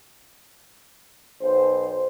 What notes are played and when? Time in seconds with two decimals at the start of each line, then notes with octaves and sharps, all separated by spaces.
1.41 B1 C5